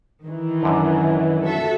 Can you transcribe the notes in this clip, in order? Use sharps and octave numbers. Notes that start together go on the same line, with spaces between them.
D#3 E3
F#2 D3
F#4 A4 E5